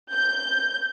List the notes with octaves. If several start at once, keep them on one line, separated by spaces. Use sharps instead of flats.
G6